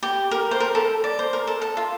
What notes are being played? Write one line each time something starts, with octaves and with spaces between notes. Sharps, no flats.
G4
A#4
C5
A#4
A4
D5
C5
A#4
A4
A4
F4